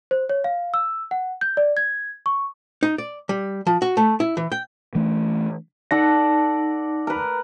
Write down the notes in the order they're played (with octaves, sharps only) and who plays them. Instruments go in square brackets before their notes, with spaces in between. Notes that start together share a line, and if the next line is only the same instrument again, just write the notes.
[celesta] C5
C#5
F5
E6
F#5
G6
D5
G#6
C#6
[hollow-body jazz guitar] D#4
D5
G3
F3
F#4
A3
E4
E3
G5
[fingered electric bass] E3 A3 D4
[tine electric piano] D#4 A5 A#6 [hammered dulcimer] A4 D5 F#5
[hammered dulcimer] A#4 B4